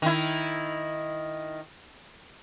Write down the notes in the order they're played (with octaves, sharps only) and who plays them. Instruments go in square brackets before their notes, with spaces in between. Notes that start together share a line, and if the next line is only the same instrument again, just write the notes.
[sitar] D#3 E4